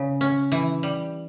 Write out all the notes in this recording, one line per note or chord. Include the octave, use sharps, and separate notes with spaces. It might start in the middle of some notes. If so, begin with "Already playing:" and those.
Already playing: C#3
C#4
E3
G3